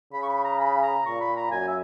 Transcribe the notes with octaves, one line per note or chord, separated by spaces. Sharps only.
C#3 B5
C#6
B5
A#5
B5
A#5
A#2 C#6
B5
A#5
F#2 G#5
E5